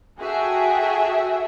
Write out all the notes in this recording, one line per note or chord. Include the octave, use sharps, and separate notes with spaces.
F#4 G#4 A4 E5 G5